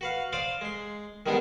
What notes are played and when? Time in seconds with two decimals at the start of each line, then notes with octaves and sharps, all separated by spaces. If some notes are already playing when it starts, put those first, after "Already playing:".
0.01 F#4 B4 F5
0.33 C5 D5 F5 C6 D#6
0.61 G#3 C6
1.26 D#3 G3 G#3 B3 D4 D#4